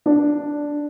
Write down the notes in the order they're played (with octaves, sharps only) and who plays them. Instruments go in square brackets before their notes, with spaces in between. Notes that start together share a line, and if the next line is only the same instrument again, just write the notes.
[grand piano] D4